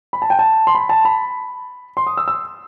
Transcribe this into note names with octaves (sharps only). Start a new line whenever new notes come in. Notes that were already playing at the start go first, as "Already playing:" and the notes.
B5
A5
G5
A5
C6
B5
A5
B5
C6
D#6
E6
E6